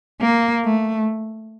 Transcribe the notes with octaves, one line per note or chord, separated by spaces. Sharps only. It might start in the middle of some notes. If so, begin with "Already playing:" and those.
A#3
A3